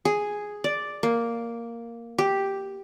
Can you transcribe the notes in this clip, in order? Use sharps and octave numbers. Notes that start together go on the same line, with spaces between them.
G#4
D5
A#3
G4